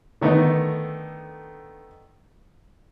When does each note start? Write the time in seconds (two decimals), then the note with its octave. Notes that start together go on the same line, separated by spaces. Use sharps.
0.21 D3 D#3 A3 B3 D#4